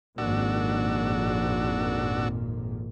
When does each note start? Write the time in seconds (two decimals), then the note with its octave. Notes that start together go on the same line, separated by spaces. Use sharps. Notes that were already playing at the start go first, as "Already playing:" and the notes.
0.18 G#1 F2 A#2 D4 F#4 E6